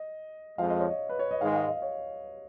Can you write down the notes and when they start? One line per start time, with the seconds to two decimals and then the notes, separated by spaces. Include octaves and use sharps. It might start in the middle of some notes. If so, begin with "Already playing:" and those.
Already playing: D#5
0.58 F2 F3 G#3 F5
0.68 D#5
0.79 C#5
0.89 D#5
1.09 B4
1.19 C#5
1.31 D#5
1.40 G#2 D#3 G#3 F5
1.55 F5
1.68 D#5
1.82 C#5